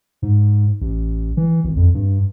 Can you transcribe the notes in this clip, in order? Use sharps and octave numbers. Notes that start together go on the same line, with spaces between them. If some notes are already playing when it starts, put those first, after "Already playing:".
G#2
A1
E3
G#1
F2
G2